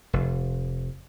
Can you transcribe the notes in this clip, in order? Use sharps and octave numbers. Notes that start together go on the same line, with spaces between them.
F1